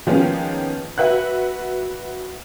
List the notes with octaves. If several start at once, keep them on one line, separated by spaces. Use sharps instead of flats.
D#3 F3 G#3 A#3 B3 C#4
F#4 B4 E5 F#5 F#6